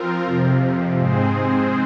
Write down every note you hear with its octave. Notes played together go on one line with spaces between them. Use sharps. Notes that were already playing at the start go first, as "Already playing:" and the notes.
Already playing: F3 C4 F4 A#4
F2 C3 F3
G#2 G#3 C4 G#4 C5